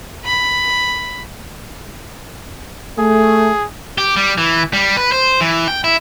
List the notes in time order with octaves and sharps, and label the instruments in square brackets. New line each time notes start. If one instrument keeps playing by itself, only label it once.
[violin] B5
[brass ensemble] A3 [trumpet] G#4
[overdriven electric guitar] G4
G3
E3
G3
B4
C5
E3
G5
E4